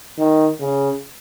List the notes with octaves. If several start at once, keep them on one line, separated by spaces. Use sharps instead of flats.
D#3
C#3